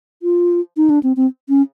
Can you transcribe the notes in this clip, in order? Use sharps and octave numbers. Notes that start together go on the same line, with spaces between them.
F4
D#4
D4
C4
C4
C#4